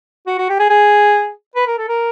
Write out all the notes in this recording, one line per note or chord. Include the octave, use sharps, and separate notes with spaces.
F#4
F#4
G4
G#4
G#4
B4
A#4
A4
A#4